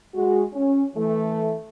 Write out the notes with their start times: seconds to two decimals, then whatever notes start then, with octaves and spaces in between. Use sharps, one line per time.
0.15 G#3 F#4
0.53 C#4
0.95 E3 A3